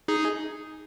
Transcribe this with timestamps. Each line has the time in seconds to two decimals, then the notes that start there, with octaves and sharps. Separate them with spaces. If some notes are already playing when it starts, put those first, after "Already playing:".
0.08 D#4 G#4